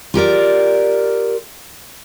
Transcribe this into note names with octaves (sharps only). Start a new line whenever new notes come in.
F4 G4 A#4 D5